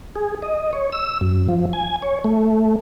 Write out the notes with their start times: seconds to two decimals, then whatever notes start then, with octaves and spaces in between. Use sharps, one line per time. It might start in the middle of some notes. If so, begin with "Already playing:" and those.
0.16 G#4
0.42 D#5
0.73 C#5
0.92 E6
1.21 F#2
1.49 F3
1.73 G#5
2.02 C#5
2.24 A3